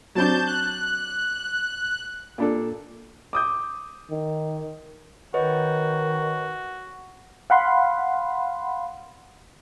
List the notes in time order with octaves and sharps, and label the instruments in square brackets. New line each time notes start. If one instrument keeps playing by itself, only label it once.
[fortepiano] F#3 C4 D4 [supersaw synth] A5 G6
[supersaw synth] F#6
[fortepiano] A#2 D4 A4
[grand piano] D6 D#6 G6
[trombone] D#3
[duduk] D#3 [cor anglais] F#4 [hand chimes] B4 C#5 D#5
[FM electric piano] F5 F#5 B5 C6